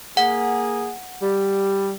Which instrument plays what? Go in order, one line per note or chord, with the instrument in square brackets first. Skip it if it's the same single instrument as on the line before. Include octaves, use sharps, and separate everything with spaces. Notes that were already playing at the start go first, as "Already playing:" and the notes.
[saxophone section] A#3 G#4 [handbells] F#5
[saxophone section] G3